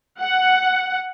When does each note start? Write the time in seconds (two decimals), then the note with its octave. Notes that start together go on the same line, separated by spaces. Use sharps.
0.20 F#5